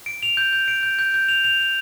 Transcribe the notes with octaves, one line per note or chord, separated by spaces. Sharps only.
D7
F7
G6
G6
D7
G6
G6
G6
F7
F7
F7